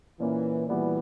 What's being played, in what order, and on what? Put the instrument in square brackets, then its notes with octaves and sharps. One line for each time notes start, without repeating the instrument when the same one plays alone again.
[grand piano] A#2 A#3 C#4 [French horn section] E3
[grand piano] A#2 G3 B3 F#4 [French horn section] E3